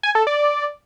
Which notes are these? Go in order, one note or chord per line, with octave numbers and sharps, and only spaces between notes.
G#5
A4
D5